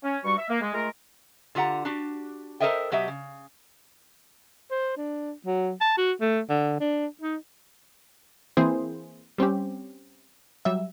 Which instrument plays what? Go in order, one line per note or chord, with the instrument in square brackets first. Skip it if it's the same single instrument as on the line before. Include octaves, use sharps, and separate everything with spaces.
[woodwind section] C#4
G2 G3 F#4 C#6
E5
A#3
G#3
G#3 A3 F4 A#4
[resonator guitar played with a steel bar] D3 F4 G4 F#5 A#5
D4 F#4 G4
A4 A#4 C5 D#5 E5 G5
B2 F#3 G4 D#5 E5
C#3
[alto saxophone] C5
D4
F#3
A5
F#4
A3
D3
D4
D#4
[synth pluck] E3 A#3 C4 E4 G#4 C5
G3 C4 C#4 G4
F#3 G3 E5